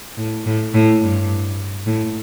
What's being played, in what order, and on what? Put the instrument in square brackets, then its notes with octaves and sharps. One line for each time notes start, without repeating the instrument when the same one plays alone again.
[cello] A2
A2
A2
G2
A2